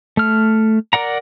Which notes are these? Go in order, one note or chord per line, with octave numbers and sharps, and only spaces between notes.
A3 F6
A#4 D5 F#5 A#5